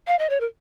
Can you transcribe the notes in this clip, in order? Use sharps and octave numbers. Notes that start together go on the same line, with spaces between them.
F5
D#5
C#5
A#4